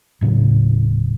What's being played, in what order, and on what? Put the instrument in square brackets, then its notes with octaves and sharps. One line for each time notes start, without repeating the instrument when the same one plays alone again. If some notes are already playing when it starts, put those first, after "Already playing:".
[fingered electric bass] D#1 A2 C#3 F#3